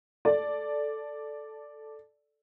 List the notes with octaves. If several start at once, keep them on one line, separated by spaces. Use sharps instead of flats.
A4 D5